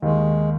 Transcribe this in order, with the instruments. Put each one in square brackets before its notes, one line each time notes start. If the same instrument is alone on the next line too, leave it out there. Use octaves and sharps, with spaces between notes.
[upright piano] D#2 D#3 [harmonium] G#3